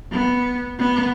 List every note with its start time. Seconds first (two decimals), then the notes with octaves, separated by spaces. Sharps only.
0.12 B3
0.79 B3